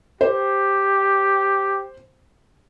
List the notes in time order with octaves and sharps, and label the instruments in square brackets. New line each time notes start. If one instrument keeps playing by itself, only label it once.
[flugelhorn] G4 [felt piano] C5